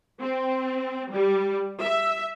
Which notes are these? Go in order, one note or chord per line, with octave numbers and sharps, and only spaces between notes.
C4
G3
E5